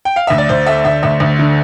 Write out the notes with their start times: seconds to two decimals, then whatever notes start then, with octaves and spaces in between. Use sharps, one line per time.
0.05 G5
0.16 F5
0.27 D2 E5
0.38 D5
0.49 D2 C5
0.66 A3 E5
0.85 D2 E5
1.03 D2 E5
1.20 D2
1.39 D3